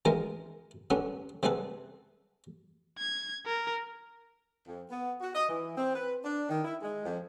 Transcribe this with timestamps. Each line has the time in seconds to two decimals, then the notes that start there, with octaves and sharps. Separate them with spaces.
0.05 B2 D#3 E3 G#3 D#4 A#4
0.90 D3 G3 B3 C#4 D4
1.43 C3 G3 B3 G#4 A4 B4
2.99 G#6
3.46 A#4
4.67 F2
4.90 B3
5.21 F#4
5.35 D#5
5.49 E3
5.77 C4
5.96 B4
6.25 D4
6.50 D#3
6.65 E4
6.82 G#3
7.06 F2